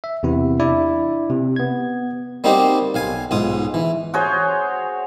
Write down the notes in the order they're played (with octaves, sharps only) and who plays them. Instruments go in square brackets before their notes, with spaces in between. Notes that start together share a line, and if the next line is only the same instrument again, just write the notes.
[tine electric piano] E5
E2 C3 B3 E4
D4 E4 D5
C3
B3 G#6
[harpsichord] G3 A#3 C4 D#4 F#4 G4
B1 F5 G#5
B1 G#2 F4 D#6
E3
[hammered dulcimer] F#4 G#4 C5 C#5